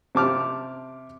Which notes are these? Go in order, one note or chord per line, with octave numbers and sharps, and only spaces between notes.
C3 A5 D6 F6